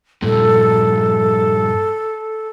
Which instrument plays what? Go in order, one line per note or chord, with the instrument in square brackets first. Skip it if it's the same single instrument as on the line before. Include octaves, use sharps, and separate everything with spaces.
[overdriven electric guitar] G2 A#2 [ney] A4